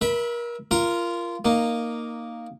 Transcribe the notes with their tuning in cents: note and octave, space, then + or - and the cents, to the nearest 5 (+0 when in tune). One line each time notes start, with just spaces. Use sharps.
A#4 +30 E5 -15 B5 +0
F4 -20 A#4 +0 A#5 +0
A#3 +0 D#4 -10